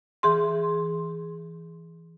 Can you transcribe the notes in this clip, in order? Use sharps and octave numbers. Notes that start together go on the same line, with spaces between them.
E3 G#4 C6